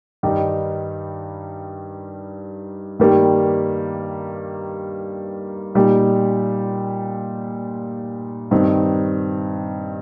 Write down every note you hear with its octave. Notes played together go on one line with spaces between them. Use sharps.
G2 D#3 G3 D#4 G4
G2 D#3 G3 A#3 G4
A#2 G3 D#4 G4
G2 D#3 C4 D#4